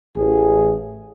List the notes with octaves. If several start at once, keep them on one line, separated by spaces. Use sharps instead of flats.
A1 G#4